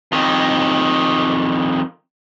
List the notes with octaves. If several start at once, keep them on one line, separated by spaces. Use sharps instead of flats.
F2 D#3